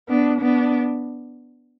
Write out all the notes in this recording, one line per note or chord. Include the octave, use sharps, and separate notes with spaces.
B3 D4
B3 D4